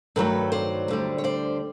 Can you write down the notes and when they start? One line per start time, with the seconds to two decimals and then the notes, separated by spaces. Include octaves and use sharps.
0.16 G2 D#3 F#3 A3 A4 B4
0.52 C5 D5
0.88 D2 D3 G3
1.18 C#5
1.24 C5 D5